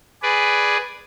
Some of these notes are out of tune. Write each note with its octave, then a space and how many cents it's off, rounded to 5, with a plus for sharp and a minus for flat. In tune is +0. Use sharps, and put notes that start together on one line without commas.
G#4 +0 B4 +0 D5 +0